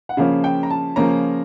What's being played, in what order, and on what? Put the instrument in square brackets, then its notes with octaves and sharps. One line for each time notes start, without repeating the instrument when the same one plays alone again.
[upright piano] F#5
C#3 F3 A#3 C#4 F5
G5
A#5
A5
C#3 F3 A#3 C#4 A#5